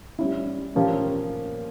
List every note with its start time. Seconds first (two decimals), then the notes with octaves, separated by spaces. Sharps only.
0.19 G3 C#4 E4
0.75 A#2 F3 A#3 C#4 G4